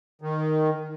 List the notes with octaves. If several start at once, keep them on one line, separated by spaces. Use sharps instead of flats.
D#3